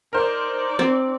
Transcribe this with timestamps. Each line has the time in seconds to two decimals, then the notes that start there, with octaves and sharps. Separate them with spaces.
0.13 D#4 A#4 C5 D5
0.79 C4